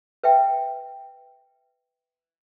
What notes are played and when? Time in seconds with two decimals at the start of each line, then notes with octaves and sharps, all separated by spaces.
0.24 B4 E5 G5